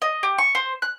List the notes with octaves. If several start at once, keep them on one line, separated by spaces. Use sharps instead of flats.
D#5
G4
C#6
C5
F#6